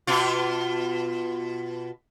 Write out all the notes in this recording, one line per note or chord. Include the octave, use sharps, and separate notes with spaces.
B2 F4